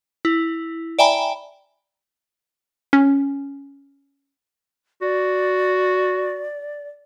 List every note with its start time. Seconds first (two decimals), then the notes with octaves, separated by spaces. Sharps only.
0.25 E4
0.99 D5 E5 G5 G#5 A#5 B5
2.93 C#4
5.02 F#4 D5